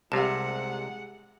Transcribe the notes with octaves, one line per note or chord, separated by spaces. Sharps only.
C2 C3 G#3 G4 F#5 A5